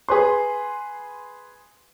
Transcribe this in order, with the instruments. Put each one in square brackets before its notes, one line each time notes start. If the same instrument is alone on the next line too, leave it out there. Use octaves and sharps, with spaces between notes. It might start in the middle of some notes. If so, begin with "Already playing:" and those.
[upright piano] G#4 B4 C6